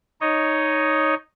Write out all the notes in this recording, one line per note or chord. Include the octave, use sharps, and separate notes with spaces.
D#4 C#5 D#5